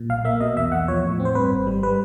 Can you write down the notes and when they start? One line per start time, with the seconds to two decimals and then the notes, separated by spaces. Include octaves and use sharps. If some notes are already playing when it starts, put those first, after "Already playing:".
Already playing: A#2
0.09 B1 F5
0.25 A#3 E5
0.40 B2 D#5
0.56 E2 E5
0.72 E2 F#5
0.88 F3 C#5
1.04 A2
1.20 C4
1.25 C5
1.35 G2 B4
1.51 G#1
1.67 G3
1.83 G3 B4